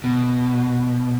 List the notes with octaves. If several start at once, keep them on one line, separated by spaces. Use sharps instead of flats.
B2